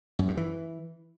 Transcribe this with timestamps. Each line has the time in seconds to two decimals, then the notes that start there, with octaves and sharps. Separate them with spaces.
0.19 F#2
0.28 G2
0.37 E3